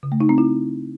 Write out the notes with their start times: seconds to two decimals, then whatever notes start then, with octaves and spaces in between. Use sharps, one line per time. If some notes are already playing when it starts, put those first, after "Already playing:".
0.03 C#3
0.12 A3
0.21 D#4
0.29 C4
0.38 E4